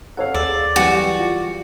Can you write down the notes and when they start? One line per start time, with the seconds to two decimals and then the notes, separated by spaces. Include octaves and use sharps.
0.17 A4 C#5 F5 F#5
0.34 D#2 G#4 A4 D5 E6
0.76 E3 F#3 G3 F#4 G#5 D6
1.20 F4